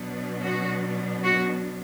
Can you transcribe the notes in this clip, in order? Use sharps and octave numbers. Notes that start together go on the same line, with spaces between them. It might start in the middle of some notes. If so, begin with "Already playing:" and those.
Already playing: B2 F#3 B3 D4
F#4
F#4